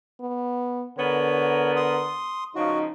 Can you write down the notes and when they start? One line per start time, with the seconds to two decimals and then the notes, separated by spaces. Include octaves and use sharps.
0.21 B3
0.98 D3 B3 A#4 C#5
1.76 C6 D#6
2.55 C#3 F3 D#4 F#4